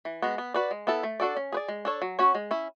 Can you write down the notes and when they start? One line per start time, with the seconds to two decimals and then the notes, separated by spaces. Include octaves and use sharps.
0.05 E3
0.22 G#3 B3 F#4
0.38 B3
0.54 F#4 B4 D5
0.71 G#3
0.87 B3 E4 A4
1.03 A3
1.20 D4 F#4 A4 D5
1.37 C#4
1.52 G#4 B4 D5
1.68 G#3
1.85 D4 A4 C#5
2.02 F#3
2.19 C#4 F#4 C#5
2.35 G#3
2.51 C#4 E4